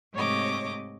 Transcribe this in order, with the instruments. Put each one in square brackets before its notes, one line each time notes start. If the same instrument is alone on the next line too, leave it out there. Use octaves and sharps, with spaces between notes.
[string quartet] G#2 C3 A3 C#5 D#5 D6